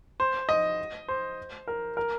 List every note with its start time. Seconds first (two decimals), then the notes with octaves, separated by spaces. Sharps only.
0.20 C5
0.49 D#5
1.08 C5
1.68 A#4
1.97 A#4